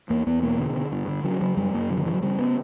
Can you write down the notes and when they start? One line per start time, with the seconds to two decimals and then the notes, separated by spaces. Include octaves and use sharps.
0.10 E2 A#3
0.26 E2 B3
0.43 B2 A#3
0.59 D3
0.76 D3
0.92 G2
1.08 D3
1.24 C#3 F#3
1.41 C#3 F#3
1.57 F#2 G3
1.73 F#2 A#3
1.90 C#3 F#3
1.97 D3
2.06 C#3 E3
2.14 F#3
2.22 C#3 G3
2.39 B3